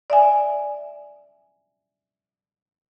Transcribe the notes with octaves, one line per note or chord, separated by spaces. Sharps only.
D5 E5 G#5